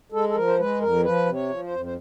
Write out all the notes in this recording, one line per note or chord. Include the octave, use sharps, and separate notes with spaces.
G#3 A4
A4
F3 A#4
C5
G#3 B4
F2 A#4
F3 B4
C3
C#5
F3
C5
F2
C5